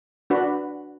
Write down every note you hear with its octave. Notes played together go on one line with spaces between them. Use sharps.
D4 F#4 B4